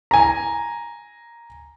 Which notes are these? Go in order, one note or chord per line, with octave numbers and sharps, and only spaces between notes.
G#5 A#5